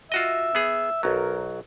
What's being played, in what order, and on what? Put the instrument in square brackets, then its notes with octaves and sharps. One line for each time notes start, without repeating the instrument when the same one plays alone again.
[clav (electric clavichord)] F4 F#4 D#5 [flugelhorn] E5
[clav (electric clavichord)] B3 G#4
[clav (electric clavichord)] B1 F#3 [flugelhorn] A#4